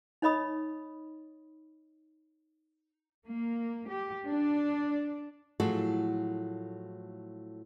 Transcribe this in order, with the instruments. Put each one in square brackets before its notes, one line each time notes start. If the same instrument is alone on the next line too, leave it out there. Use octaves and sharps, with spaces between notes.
[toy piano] D#4 C#5 D#5 B5 D#6
[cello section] A#3
G4
D4
[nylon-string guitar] A2 F3 F#3 F#4 G#4 A4